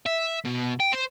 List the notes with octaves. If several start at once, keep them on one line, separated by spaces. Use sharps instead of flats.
E5
B2
G5
C5